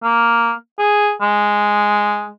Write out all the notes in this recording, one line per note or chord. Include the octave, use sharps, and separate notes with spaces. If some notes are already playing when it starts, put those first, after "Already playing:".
A#3
G#4
G#3